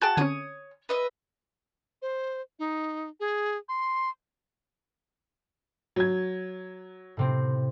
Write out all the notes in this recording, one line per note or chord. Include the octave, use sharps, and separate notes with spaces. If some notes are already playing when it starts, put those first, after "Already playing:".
F#4 G#4 G5 A5 F#6
D3 C4 C#4 C#5 D#6
B4 D#5 E5
C5
D#4
G#4
C6
F#3 G#6
A2 C3 C4